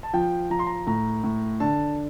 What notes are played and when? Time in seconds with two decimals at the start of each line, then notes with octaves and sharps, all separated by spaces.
0.03 A5
0.13 F3 G5
0.50 F3 A#5
0.59 C6
0.67 A#5
0.87 A2 A#5
1.24 A2
1.60 D3 A5